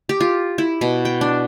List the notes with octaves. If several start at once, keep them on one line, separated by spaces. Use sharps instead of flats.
G4
F4
E4
B2
G5
D4